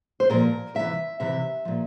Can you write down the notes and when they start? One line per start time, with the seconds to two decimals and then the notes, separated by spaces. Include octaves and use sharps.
0.20 C5
0.30 A#2 F3 A#4
0.75 C3 E3 E5
1.20 C3 E3 E5
1.65 A#2 F3